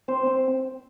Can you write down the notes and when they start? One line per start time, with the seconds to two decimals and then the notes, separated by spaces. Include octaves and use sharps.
0.08 C4 C5
0.27 C4